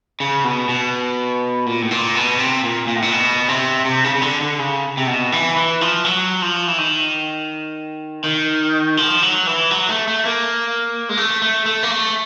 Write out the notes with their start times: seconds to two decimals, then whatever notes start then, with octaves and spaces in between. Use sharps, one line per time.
0.20 C#3
0.44 B2
0.69 B2
1.66 A#2
1.82 A2
1.91 A#2
2.15 B2
2.39 C3
2.63 A#2
2.87 A#2
2.96 A2
3.02 A#2
3.12 B2
3.49 C3
3.85 C3
4.04 C#3
4.15 C#3
4.22 D3
4.41 D3
4.59 C#3
4.97 C3
5.07 B2
5.32 E3
5.56 E3
5.81 F3
6.05 F#3
6.42 F3
6.68 E3
6.78 D#3
8.24 D#3
8.97 F3
9.22 F#3
9.47 E3
9.71 F#3
9.89 A3
10.07 A3
10.25 A#3
11.09 G#3
11.18 A3
11.42 A3
11.66 A3
11.83 A#3
11.91 A3